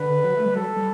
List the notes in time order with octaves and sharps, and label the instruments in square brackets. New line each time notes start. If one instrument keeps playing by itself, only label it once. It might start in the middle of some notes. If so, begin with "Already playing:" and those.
Already playing: [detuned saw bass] D3 [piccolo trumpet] B4
[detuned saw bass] F#3
A3
G3
[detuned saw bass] F#3 [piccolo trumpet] A4
[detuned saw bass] G3